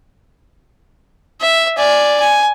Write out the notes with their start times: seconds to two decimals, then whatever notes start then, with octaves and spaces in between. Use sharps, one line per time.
1.41 E5
1.77 D5 G#5
2.20 G#5